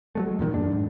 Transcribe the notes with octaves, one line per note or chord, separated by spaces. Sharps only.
F#3 G#3 A3
G#3
E2 A#2 D3 D#3
F#2 D4
G#2